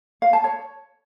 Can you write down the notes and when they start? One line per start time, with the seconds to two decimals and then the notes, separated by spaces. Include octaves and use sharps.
0.22 F5
0.33 A5
0.44 C#5